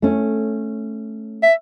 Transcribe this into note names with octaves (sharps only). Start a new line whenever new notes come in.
A3 C#4
E5